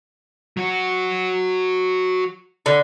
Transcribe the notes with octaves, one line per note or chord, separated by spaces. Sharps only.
F#3 F#4
D3